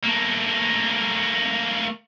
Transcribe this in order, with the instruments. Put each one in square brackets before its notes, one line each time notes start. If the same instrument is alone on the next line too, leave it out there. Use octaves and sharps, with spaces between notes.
[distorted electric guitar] A3 A#3